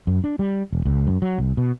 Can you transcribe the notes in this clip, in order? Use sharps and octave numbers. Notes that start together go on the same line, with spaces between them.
F#2
D4
G3
E1
C#2
F#2
F#3
C2
B2